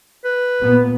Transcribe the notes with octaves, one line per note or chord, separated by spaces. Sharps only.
B4
A#2 B3